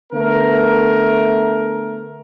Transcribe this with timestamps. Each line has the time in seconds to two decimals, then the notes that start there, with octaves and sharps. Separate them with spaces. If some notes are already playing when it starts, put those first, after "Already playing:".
0.13 D3 A3 B3 A#4